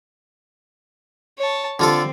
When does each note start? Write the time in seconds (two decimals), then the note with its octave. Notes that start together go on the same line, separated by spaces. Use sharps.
1.38 C#5 A5
1.80 D3 C4 F4 A4